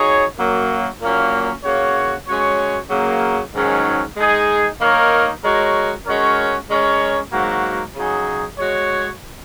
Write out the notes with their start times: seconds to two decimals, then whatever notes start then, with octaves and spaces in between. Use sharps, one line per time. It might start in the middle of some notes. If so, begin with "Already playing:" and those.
Already playing: F#3 D#4 G#4 C#5
0.38 F#2 F#3 A#3
1.00 A#2 F#3 A#3 C#4
1.64 C#3 A#3 F#4 C#5
2.27 G#3 C#4 F#4 C#5
2.90 C#3 F#3 A#3
3.53 G#2 D#3 F#3 C#4 G#4
4.17 G#3 D#4 G#4
4.80 D#3 A#3 D#4 A#4 C#5
5.43 G#3 F#4 A#4 C#5
6.06 G#3 C#4 F#4 A#4 C#5
6.69 G#3 C#4 A#4 C#5
7.33 G#2 F#3 A#3 F#4
7.95 C#3 F#3 D#4 G#4
8.58 G#3 F#4 C#5